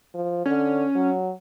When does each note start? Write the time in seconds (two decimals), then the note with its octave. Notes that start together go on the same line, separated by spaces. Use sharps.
0.14 F3
0.46 D3 C#4
0.95 F#3